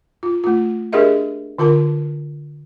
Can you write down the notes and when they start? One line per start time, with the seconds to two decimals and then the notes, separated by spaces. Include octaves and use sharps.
0.23 F4
0.44 A3 F4
0.93 D4 G4 G#4 A#4 D#5 E5
1.59 D3 F4 A#4 A5